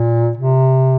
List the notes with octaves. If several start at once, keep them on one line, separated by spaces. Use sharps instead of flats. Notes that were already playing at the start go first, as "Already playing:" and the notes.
Already playing: A#2
C3